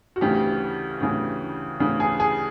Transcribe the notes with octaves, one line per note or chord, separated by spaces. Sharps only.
F#4
D2 C#3 E3 G4
D2 C#3 E3
D2 C#3 E3
G#4
G#4